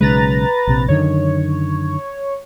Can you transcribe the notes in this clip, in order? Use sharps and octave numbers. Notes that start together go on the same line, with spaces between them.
B1 C#3 G#3 B4 A#5 A6
A#1 C3
F#2 D3 D#3 C#5